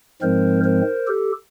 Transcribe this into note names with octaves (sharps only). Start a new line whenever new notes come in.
G#2 F3 G#3 C4 A#4 C5
A#4 C5
G4 A4